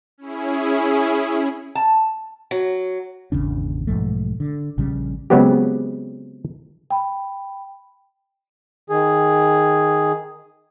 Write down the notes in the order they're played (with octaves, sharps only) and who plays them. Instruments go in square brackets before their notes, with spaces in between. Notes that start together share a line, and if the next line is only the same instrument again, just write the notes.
[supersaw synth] C#4 E4 G#4
[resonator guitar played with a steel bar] A5
[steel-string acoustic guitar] F#3
[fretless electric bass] G#1 E2 C#3 D4
B1 G#2 F3 A3
D3
A#1 C#3 G3 C#4
[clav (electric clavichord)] C#3 F#3 G#3 B3 C4 G4
[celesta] G5 B5
[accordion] D#3 G#4